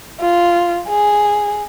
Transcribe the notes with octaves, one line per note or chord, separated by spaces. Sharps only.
F4
G#4